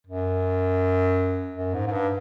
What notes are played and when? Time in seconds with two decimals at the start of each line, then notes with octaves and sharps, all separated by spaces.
0.07 F#2
1.55 F#2
1.74 G#2
1.87 G#2
1.92 G2